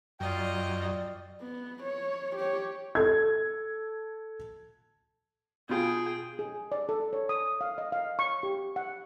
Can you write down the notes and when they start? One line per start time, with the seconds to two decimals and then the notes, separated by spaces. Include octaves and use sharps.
0.20 F#2 F4 D5 D#5 G5
1.41 B3
1.83 C#5
2.35 G4 C#5
2.95 A4 G#6
5.69 B2 F4 G#4 G5
6.39 G#4
6.72 D5
6.89 A4
7.13 C#5
7.29 D#6
7.61 F5
7.78 D#5
7.92 F5
8.19 C#6
8.43 G4
8.76 F#5